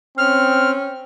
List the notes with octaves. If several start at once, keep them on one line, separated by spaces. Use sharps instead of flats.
C4 C#4 F6